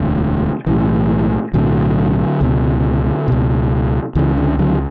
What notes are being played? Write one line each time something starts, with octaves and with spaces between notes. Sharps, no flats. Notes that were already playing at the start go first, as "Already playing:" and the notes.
Already playing: E1 D2 D3
B1 A2 E3
B1 A2 D3 F#3
C#2 B2
C#2 B2
C#2 C#3 E3
D3
D3 F#3